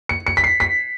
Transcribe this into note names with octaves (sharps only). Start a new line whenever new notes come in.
C#7
C#7
B6
C7
B6